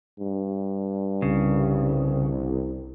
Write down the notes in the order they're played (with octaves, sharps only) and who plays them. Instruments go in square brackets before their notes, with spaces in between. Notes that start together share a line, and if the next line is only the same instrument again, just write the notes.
[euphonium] G2
[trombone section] C2 [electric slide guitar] C#3